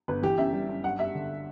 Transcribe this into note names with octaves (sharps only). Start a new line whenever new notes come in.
G1 B4
E3 G4
F#2 E5
G3
F#2
G2 F#5
G3 E5
D3